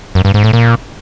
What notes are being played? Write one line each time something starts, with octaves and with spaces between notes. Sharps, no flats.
F#2
G2
G#2
A2
A#2